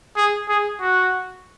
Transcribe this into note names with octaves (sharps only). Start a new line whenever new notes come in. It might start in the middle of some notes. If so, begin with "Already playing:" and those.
G#4
G#4
F#4